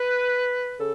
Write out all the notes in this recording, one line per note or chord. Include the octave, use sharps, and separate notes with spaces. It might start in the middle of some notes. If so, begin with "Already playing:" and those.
Already playing: B4
C#3 A4